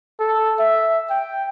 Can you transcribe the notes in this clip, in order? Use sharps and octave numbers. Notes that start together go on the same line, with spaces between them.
A4
E5
G5